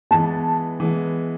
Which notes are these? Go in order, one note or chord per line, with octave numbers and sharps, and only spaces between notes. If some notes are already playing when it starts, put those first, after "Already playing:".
E3 G#3 B3 A5
E3 G#3 B3